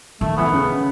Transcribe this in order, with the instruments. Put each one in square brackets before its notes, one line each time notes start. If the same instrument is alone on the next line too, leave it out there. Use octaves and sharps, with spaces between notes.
[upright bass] D#3 [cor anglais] A3
[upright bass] E3 [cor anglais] B3
[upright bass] D#3
C#3